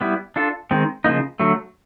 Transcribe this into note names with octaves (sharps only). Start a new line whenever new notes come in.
G3 B3 E4
D4 F4 A4
D#3 G#3 C4
C#3 F3 A#3 D#4
D3 F#3 A3